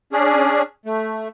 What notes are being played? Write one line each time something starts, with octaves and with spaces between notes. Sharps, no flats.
C#4 D4 G#4
A3